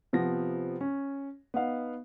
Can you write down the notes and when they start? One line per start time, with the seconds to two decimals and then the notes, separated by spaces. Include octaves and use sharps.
0.13 C3 F3 B3 A#6
0.81 C#4
1.54 B3 D#4 F5